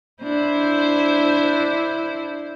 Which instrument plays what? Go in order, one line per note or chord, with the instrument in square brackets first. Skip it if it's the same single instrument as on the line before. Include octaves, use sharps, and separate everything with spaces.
[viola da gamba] D4 E4 C5